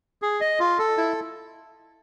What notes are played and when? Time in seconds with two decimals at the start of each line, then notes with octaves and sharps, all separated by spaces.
0.22 G#4
0.41 D#5
0.60 F4
0.78 A4
0.97 E4